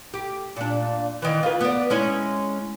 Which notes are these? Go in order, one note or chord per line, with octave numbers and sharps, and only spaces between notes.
G4
A#2 D4
D#3 E3
F4 B4
B3 D5
G#3 C#4 E4